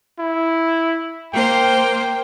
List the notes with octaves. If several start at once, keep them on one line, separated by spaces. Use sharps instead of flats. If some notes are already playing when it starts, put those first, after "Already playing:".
E4
A#3 C5 G5